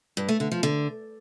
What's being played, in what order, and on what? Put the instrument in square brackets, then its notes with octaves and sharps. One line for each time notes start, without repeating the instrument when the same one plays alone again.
[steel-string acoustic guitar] G2
A3
D3
F3
D3